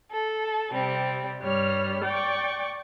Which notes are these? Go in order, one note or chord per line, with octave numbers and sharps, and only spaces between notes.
A4
C3 G3 C4
G2 G3 C#5 F6
D5 G5 C#6 D6